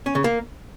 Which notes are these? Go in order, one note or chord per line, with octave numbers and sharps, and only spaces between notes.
C#4
C#3
A#3